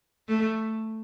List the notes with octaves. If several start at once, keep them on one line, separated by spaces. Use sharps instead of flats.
A3